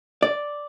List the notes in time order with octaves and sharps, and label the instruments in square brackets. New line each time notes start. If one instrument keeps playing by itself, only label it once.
[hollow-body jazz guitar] D5